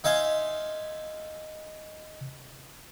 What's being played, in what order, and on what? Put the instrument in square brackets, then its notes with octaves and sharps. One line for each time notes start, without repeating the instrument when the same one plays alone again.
[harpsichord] D#4 E5 F5 G#5 C6